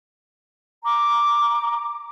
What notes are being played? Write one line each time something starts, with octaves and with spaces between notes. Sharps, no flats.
A#5 D6